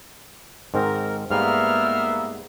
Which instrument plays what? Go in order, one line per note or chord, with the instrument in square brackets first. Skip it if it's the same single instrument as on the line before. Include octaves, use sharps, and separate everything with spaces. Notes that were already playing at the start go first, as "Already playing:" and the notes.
[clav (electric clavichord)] G#2 D#3 C4 [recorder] A#4
[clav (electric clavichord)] G#2 G3 [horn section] A#3 B3 E5 [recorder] F6